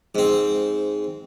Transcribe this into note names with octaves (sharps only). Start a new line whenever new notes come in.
G#2 C4